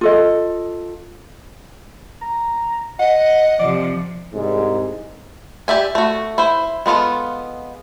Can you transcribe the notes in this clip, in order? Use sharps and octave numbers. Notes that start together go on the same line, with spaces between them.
F4 A4 D#5
A#5
D#5 F#5
C3 F3 D5
C2 G#2
G4 D5 E5 G#5
A3 F#4
E4 C5
G#3 B3 F4 A4